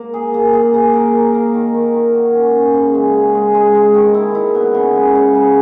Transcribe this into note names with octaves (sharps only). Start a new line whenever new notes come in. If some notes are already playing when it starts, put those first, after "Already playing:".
Already playing: A#3
G#4
A#3
G#4
A#3
A#4
A#4
A#3
D#3
D#3
D#3
F#4
C#4
C#4
C#3
G#3
G#4
G#3
G#3
G#3
D#3
E4
E4
B3
C#3
G#3
C#3
C#3